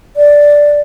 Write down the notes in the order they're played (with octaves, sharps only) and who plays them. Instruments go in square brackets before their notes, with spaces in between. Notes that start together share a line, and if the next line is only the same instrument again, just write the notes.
[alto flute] D5